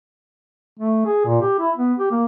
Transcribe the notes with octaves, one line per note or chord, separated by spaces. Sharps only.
A3
G#4
A#2
G4
E4
B3
G4
A#3